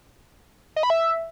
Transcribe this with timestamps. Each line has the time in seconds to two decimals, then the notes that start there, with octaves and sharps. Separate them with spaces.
0.76 D#5
0.83 B5
0.90 E5